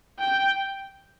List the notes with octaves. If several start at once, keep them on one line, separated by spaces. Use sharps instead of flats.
G5